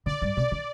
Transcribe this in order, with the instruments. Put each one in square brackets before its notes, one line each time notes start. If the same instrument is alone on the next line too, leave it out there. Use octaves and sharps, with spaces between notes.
[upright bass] D3 [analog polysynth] D5
[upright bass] G2
[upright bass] C3 [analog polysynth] D5
[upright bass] D#3